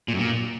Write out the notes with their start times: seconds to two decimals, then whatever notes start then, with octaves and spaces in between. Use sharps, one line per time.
0.08 A#2
0.14 F#2
0.19 A#2